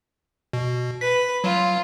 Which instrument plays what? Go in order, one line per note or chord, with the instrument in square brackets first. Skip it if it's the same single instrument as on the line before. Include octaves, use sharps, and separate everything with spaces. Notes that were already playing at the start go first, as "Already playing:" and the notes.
[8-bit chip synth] B2
[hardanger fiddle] B4 [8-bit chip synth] B6
[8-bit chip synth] F#3 [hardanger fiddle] F4